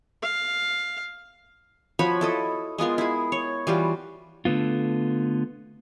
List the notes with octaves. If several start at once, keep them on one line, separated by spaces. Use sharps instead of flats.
F5
F3 F#4 C#5 B5
E4 A4 D#5
G#3 B3 F4 A#4
E4 G#4
C#5
E3 G3 F4 F#4
D3 A3 B3 F4